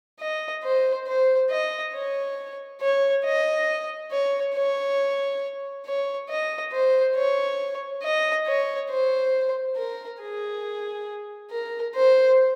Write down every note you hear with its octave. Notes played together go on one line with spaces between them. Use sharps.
D#5
C5
C5
D#5
C#5
C#5
D#5
C#5
C#5
C#5
D#5
C5
C#5
D#5
C#5
C5
A#4
G#4
A#4
C5